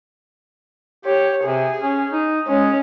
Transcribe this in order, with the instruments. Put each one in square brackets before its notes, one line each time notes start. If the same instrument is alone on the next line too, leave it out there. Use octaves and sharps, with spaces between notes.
[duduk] G4 [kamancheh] C#5
[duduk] C3 [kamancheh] G#4
[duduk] C#4
D#4
[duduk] G#3 [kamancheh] C#4